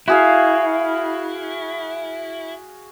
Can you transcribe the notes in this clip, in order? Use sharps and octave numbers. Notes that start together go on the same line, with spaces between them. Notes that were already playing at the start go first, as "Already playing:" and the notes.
E4 F#4 G#4 F5